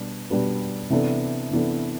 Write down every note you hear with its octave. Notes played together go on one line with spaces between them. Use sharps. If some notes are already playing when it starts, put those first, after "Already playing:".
Already playing: B2 G3 D4 B4
B2 G3 D4 G4 B4
C3 E3 B3 D4 A4
C3 E3 B3 D4 A4